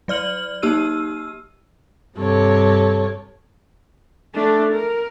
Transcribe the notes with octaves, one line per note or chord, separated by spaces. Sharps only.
F#3 D5 F6 F#7
A#3 D#4 G4 E6 F6 D#7
G2 C3 A4 C#5
A3 D4
A#4